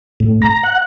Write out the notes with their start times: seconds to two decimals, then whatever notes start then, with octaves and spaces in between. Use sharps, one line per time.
0.20 A2
0.42 A#5
0.63 F#5